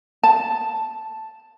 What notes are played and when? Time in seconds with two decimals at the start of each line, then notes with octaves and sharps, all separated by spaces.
0.23 A5